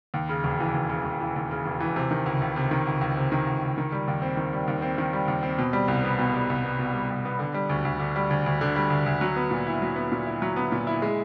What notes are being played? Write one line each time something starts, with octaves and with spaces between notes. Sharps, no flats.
D#2
C#3
E1
E3
D#2
C#3
E1
E3
D#2
C#3
E1
E3
C3
D#3
C#2
C#2
C3
D#3
C#2
C#2
C3
D#3
C#2
C#2
D#3
G3
D#2
C4
D#3
G3
D#2
C4
D#3
G3
D#2
C4
B2
G3
C2
B3
B2
G3
C2
B3
B2
G3
C2
B3
D3
G3
D2
D2
D3
G3
D2
D2
D3
G3
D2
D2
F#3
B3
A#2
E4
F#3
B3
A#2
E4
F#3
B3
A#2
E4
G#3